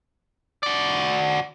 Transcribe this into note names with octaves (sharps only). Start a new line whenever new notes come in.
F#4 D5